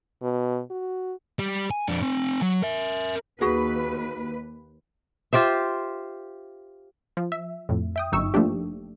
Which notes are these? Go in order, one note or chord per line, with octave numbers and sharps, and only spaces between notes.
B2
F#4
G3
G#5
F2 D4
C4 G#5
F#3
A#4 E5
D#2 F#4 G#4 B4
F4 G4 C5 E5
F3
E5
F2 A2
E5 G5 D#6
G1 F#2 D#4 C#6 E6
F3 A3 A#3 D4 G4